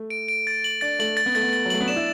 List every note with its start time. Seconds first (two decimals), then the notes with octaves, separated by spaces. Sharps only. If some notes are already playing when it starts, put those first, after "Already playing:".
Already playing: A3
0.10 D7
0.28 D7
0.47 A6
0.64 F#7
0.81 D4 A6
0.99 A3 F#7
1.17 A6
1.26 B3
1.35 A3 A6
1.43 B3
1.53 A6
1.65 F#3
1.70 A3 F#7
1.81 B3
1.88 D4 E7
1.96 E4